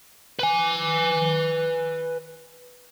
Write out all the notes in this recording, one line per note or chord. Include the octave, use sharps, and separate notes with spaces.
B4 G#5